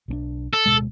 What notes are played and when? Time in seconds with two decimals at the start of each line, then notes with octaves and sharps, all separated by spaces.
0.08 B1 C4 D4
0.53 A4
0.66 D1 B2 G#3